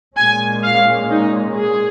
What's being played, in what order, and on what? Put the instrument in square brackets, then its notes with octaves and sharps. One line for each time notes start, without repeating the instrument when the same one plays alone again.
[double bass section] A#2 G#3 C#4 [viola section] G#5
[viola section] F5
D#4
G#4